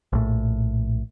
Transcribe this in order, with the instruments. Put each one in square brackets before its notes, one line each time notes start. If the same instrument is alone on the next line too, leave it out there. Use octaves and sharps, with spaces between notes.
[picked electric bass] A#1 A2